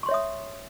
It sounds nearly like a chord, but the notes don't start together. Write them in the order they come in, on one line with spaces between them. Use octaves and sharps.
C#6 C6 C#5 E5 D#6